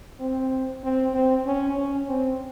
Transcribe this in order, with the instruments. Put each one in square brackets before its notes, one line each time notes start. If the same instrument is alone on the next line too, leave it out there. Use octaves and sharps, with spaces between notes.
[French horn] C4
C4
C4
C#4
C#4
C4